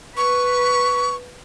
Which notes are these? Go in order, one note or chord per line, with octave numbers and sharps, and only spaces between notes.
B4 C#6